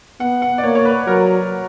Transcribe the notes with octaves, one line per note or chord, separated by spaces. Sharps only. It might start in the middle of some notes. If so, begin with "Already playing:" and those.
B3 F#5
F#5
D5
A#3 C#5
C#5
B4
F#3 A#4